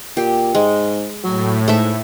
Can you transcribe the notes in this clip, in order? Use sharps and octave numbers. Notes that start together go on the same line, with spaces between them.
A#2 G4
G#2 G#3
A2 F#3
G#2 A3 A4 E5